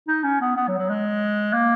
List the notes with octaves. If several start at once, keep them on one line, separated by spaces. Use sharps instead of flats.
D#4
C#4
B3
B3
F#3
F#3
G#3
A#3